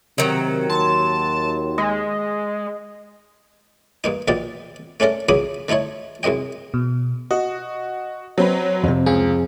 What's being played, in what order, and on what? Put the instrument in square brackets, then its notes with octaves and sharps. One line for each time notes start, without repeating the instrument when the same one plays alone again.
[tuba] C3 [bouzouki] D#3 F#3
[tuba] D#2 [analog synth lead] A5 [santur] C6
[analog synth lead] G#3 [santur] D#5
[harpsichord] G2 A#3 D#4
A#1 B2 A#3 D#4 D5 G5
A3 C#4 D4 A4 A#4
C#2 C#3 F#3 B5 D6 D#6
D3 A3 D#4 E4 C#5
C2 F#2 G#3 D#5 G5
[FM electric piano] B2
[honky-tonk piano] F#4 [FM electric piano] D#5
[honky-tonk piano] F#3 C4 B4
[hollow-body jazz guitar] F2 C3
[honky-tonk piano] C#2 [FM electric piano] G#4